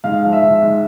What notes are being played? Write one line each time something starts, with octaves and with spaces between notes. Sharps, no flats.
G#2 F5
F3
E5
G#2
G#2